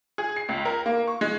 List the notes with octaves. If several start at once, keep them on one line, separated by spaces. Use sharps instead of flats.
G#4
C7
C#2
A#4
A#3
C#6
G#3